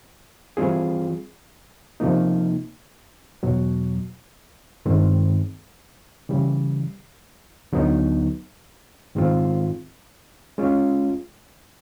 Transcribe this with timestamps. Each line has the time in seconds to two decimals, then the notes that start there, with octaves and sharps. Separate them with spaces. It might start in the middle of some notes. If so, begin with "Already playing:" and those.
0.57 E3 G3 C4 F4 G#4
2.00 C3 F3 A#3 D#4
3.43 E2 B2 F#3
4.85 G2 D#3 G#3 C4
6.29 C#3 E3 G3
7.72 D2 D3 F#3 B3 D#4
9.15 G#2 D#3 G#3 C4 F4
10.58 G#3 C#4 F4